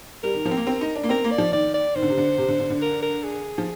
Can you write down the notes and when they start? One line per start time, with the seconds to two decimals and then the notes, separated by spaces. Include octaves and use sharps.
0.24 G3 A#4
0.35 D#3
0.45 F3
0.51 C4
0.57 A#3
0.67 C4
0.81 D#4
0.96 D4
1.04 A#3
1.09 C4 A#4
1.24 A#3
1.31 D5
1.38 F3
1.52 D#3 D5
1.74 D5
1.96 D#3 C5
2.02 D3
2.10 C3
2.17 D3
2.38 C3
2.49 D3
2.60 D3
2.70 D3
2.82 A#4
3.03 A#4
3.23 G#4
3.58 F3